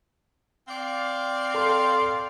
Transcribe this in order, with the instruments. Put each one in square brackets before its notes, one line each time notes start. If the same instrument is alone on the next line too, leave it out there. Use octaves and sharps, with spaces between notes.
[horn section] C4 D5 F5
[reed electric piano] A4 C6